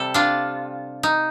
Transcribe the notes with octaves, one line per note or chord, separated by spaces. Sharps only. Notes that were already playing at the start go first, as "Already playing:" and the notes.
Already playing: C3 G3 A4
D4 F4
D#4